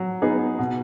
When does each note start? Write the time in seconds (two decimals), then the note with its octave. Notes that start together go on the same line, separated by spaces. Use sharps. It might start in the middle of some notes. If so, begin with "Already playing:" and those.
Already playing: F#3
0.22 B3 D#4 G#4
0.59 B2